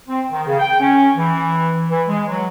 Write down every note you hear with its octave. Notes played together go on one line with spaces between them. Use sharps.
C4
D#3
C#3
G5
C#4
E3
E3
G#3
F#3